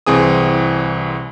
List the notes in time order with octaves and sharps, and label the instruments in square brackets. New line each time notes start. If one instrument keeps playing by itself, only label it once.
[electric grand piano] C2 E3 C4 G#4 D#6